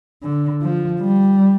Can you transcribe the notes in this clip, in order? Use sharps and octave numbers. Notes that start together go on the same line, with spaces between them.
D3
F3
G3